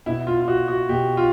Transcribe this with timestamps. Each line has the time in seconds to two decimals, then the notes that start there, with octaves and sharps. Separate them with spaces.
0.06 B2 E4
0.27 F4
0.41 F4
0.48 F#4
0.68 F#4
0.89 B2 G4
1.17 F4